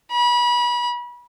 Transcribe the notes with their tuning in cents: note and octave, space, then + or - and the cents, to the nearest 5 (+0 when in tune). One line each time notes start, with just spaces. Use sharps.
B5 -30